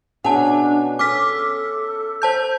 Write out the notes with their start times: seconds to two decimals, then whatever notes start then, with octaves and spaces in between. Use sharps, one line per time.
0.24 B2 C#4 D4 G#4 F#5 A5
0.99 C#4 A4 D6 F6 B6
2.22 C5 A5 G6